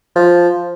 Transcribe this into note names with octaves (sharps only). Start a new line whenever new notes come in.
F3